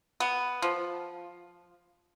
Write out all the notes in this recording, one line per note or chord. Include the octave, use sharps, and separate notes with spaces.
B3
F3